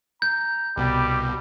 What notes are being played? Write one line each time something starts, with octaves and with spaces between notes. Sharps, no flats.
A#5 G6
C2 B2 G3 D6